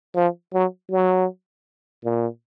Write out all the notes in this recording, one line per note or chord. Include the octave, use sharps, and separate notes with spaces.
F3
F#3
F#3
A#2